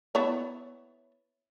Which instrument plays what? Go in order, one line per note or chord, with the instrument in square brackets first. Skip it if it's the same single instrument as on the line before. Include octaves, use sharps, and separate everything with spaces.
[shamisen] B3 E4 C#5